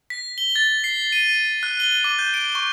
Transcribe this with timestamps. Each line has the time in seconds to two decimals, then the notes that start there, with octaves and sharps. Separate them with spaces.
0.10 B6
0.38 G7
0.56 A6
0.84 C7
1.12 D#7
1.63 F#6
1.80 G7
2.04 D6
2.19 G6
2.34 D7
2.55 C#6